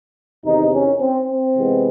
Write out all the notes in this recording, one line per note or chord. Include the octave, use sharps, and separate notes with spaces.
E2 C3 D#3 D#4
C#4
C4
C4
C3 E3 G#3 B3